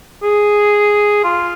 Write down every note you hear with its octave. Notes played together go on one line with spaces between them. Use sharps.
G#4
F4